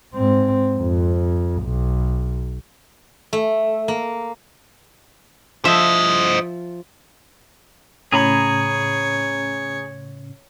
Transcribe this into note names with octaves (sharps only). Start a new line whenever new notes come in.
G#2 C4
F2
B1
A3
A#3
F3 C5 D#5 E5
A2 C#3 C#4 G#4 C#5 A#5 B5